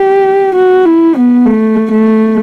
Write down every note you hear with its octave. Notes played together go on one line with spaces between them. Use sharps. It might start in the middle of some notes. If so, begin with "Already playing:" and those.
Already playing: G4
F#4
E4
B3
A3
A3